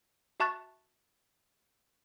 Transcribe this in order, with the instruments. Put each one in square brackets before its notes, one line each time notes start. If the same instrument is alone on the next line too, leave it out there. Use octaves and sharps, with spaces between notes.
[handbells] F#4 E5 A5 C#6 F#6 A6